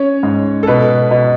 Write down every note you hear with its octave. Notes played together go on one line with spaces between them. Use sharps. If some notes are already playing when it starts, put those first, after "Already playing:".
Already playing: C#4 C#5
G#2
A4
B2 B4
B2